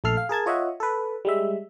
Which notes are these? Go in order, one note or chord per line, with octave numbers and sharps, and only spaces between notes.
A#1 A3 A4 F6 C7
F5
G#4 A#4 A5 G#6
F4 C#5 D#5 E5 F#5
A4 B4
G3 G#3 E5